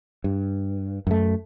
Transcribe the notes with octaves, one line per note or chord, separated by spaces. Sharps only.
G2
F#2 A3